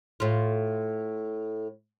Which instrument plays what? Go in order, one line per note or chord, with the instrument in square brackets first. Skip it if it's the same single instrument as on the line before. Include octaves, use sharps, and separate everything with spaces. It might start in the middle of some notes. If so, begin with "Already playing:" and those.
[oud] A2 F4